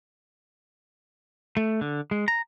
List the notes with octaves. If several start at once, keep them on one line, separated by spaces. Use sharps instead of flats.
A3
D3
G#3
A#5